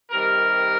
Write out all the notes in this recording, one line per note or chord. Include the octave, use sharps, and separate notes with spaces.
C3 D#3 G3 A#4